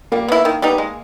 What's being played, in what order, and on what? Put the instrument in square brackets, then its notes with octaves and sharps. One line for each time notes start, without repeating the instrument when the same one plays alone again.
[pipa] G3 [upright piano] A#3
[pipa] B3 E4
D#3
G3 B3 D#4
G#3